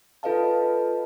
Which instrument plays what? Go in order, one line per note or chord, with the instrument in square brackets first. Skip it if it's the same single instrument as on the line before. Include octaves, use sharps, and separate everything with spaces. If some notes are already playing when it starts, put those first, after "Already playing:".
[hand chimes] F4 A4 B4 D#5 F5 A5